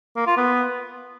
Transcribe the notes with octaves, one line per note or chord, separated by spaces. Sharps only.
A#3
F4
B3